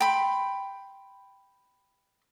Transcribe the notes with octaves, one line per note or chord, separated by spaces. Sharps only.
G5 B5 C6